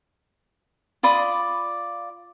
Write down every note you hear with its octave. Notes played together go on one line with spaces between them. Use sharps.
F4 D5 B5 D#6